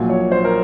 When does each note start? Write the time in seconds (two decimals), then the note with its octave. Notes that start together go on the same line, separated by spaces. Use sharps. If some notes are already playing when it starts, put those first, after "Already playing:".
Already playing: A#1 A#2 F#3
0.09 C#5
0.32 C5
0.45 A#4